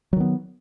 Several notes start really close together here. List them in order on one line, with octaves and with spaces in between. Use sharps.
F#3 D#3 B3